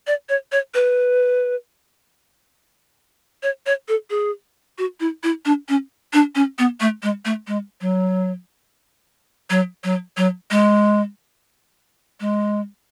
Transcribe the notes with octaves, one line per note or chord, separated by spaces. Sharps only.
D5
C#5
C#5
B4
C#5
C#5
A4
G#4
F#4
E4
E4
D4
C#4
D4
C#4
B3
A3
G#3
A3
G#3
F#3
F#3
F#3
F#3
G#3
G#3